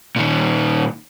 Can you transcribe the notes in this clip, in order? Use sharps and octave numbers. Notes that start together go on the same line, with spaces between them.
A#2 D#3